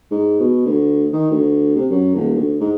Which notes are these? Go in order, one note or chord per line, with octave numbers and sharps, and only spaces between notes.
G#2
B2
D2
D#3
D2
C3
F#2
D#1
D2
G#2